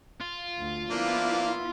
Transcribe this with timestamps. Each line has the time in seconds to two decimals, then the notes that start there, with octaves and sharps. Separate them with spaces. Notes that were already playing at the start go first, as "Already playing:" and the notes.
0.21 F4
0.57 D2
0.90 F3 A#3 B3 D4 E4 F5